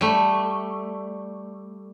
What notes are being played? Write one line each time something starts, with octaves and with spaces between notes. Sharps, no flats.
G3 A3